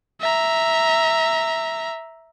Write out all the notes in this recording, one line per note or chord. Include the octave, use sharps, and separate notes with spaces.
E5 A#5